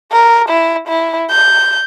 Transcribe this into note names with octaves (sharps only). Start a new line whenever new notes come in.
A#4
E4
E4
G6